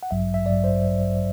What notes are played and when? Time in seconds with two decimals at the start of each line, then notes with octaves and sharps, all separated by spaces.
0.03 F#5
0.11 A1 G2 F#3 E5
0.34 E5
0.46 A1 G2 F#3 D5
0.64 C5